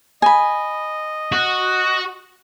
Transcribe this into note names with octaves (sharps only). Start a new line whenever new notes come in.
D#5 G#5 B5
F#4